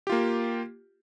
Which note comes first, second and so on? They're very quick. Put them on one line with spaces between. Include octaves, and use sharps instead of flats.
G4 F4 A#3